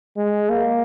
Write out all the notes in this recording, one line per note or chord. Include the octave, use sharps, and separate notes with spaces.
G#3
A#3